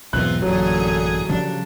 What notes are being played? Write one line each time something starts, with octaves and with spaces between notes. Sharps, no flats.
B1 E2 G#2 B3 C4 F4 F#6
A1 F#2 A#2 D3 F#3 G#4
C#3 F3 G3 D4